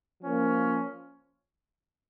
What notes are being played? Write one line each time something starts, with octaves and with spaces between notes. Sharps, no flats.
F3 A#3 C#4